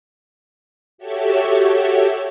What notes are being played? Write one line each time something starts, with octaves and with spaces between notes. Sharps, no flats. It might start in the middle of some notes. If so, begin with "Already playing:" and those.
F#4 G4 A4 C#5 E5